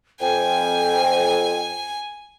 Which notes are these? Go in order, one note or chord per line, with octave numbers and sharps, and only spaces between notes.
F2 G5 G#5